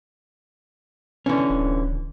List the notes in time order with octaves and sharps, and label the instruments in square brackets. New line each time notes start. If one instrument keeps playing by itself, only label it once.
[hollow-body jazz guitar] D3 E3 C#4
[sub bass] D1